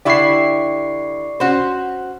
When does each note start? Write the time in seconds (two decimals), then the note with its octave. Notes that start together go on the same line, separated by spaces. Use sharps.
0.05 D3 E4 G4 D5 C#6 C7
1.40 C#4 F#4 C5